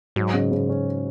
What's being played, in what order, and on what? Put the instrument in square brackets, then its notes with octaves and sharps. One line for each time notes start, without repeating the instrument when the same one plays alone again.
[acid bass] G#2 [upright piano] F#3
[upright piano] C#3
C#3
C#4